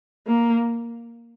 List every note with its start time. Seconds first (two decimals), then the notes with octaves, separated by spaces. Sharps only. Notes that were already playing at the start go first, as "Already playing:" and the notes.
0.27 A#3